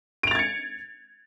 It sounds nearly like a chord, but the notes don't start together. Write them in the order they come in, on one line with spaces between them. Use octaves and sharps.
D7 F7 A6 G#6 C#7